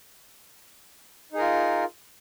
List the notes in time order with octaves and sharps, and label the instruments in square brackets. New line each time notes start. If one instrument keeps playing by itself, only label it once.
[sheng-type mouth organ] D#4
G#4
A#4
F4